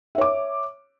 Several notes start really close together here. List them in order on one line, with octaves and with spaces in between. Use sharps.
E5 C#5 D6